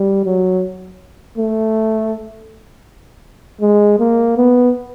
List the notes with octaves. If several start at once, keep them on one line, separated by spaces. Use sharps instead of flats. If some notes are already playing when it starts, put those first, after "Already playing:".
Already playing: G3
F#3
A3
G#3
A#3
B3